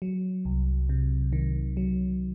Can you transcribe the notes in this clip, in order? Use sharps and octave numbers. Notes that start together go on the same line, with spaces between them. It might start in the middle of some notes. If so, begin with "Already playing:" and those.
F#3
C2
C3
D#3
F#3